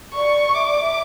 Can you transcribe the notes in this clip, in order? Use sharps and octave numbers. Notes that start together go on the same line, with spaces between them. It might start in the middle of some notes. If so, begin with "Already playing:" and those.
D5 C#6
E5 D6
D5
E5